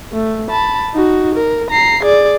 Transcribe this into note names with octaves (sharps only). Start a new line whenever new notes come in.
A3
A5 B5
D#4 F#4
A#4
A#5 C7
G#4 D5